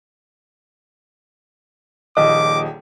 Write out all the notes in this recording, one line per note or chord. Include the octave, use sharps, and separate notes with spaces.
D#1 A#1 D#3 D#5 D6